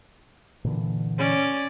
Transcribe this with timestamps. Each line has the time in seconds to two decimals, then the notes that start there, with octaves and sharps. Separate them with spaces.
0.64 A#2 D3 E3
1.19 C#4 D5